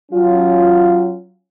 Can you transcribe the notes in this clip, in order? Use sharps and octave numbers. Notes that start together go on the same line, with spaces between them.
F#3 C#4 F4